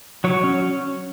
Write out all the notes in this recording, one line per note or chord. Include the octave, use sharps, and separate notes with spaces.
F#3 C#5
C#4